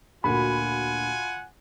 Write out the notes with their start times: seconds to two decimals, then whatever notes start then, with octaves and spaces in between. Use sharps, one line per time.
0.24 D2 A#2 F4 F#4 F#5 G#5 B5